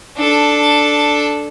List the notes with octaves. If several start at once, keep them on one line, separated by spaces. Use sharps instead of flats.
D4 A4